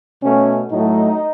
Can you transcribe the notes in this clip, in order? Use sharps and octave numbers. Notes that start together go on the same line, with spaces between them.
B2 A3 C#4
A2 F#3 A3 D#4